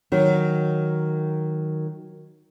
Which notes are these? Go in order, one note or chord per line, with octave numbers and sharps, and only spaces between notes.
D#3 F#3